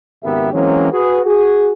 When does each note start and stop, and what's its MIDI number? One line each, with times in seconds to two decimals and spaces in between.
0.23 0.49 32
0.23 0.49 37
0.23 0.49 59
0.23 0.49 67
0.23 0.49 70
0.23 0.49 76
0.53 0.89 52
0.53 0.89 54
0.53 0.89 56
0.53 0.89 58
0.53 0.89 60
0.53 0.89 61
0.92 1.20 66
0.92 1.20 68
0.92 1.20 71
1.26 1.73 66
1.26 1.73 68